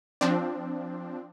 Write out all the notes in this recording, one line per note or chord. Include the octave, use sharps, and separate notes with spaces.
F3 C4 D4